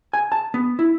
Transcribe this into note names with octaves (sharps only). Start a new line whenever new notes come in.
G#5
A5
B3
E4